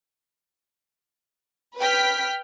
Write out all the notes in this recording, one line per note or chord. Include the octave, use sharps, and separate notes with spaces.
B4 G5 F6 B6